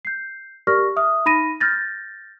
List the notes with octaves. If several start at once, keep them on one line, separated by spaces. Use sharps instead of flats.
G6 C7
G4 A#4 D5 C#6 F6 A#6
E5 D#6 F6
D#4 B5 A#6 D#7
F6 G6 A6 A#6